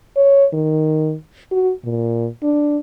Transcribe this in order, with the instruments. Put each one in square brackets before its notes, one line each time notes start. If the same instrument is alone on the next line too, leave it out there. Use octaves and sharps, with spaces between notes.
[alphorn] C#5
D#3
F#4
A#2
D4